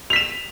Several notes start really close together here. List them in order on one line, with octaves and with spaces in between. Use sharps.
F7 B6 E7